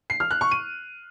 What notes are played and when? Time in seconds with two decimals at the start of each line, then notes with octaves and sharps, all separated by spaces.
0.10 C7
0.20 F6
0.31 F#6
0.41 C#6
0.51 D#7